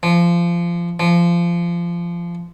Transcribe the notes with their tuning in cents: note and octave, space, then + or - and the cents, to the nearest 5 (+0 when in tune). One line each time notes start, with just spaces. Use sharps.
F3 -20
F3 -20